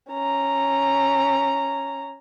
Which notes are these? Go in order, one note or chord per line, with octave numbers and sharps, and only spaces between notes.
C#4 A#5